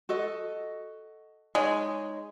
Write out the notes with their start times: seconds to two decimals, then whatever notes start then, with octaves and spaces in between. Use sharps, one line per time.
0.09 F#4 A4 D#5
1.55 G#3 D#4 C#5